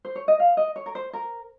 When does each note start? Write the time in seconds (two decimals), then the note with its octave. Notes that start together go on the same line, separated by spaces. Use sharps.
0.05 C5
0.16 C#5
0.28 D#5
0.40 F5
0.57 D#5
0.76 C#5
0.86 A#4
0.95 C5
1.13 A#4